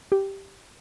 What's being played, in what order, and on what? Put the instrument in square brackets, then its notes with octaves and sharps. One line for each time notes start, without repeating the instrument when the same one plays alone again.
[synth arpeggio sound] G4